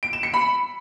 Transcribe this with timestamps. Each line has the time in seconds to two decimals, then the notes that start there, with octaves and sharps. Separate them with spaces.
0.03 D7
0.13 E7
0.23 C#7
0.34 B5